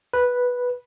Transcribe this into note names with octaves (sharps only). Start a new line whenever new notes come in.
B4